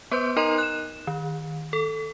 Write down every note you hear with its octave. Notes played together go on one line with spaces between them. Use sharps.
B3 B4 C5 C6 G6
D#4 A#4 D#5 A#5 C6 D#7
F#6 E7
D#3
A4